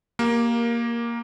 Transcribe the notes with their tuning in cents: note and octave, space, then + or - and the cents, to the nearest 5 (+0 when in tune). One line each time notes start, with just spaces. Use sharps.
A#3 +5 G4 +0 A#4 +15